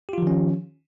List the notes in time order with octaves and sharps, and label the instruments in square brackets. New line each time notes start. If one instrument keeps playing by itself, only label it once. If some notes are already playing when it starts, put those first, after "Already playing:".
[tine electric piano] G4
F4
F3
D#3
C#4